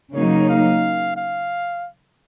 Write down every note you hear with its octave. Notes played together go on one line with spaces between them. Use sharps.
C#3 F#3 A#3 D#4 C#5
F5
F5